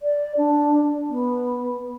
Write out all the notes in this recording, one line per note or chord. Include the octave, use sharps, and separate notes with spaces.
D5
D4
B3